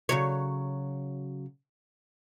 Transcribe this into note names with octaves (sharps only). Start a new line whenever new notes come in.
C#3 F#3 C#5